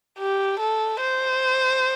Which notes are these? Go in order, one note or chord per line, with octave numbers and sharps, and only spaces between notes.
G4
A4
C5